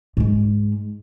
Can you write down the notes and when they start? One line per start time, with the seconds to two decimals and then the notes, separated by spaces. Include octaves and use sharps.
0.17 G#2 G#3